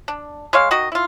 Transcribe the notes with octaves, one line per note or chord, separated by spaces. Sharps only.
D4
G#3 C#5 F5
D#3 F#4 D#5
E4 F4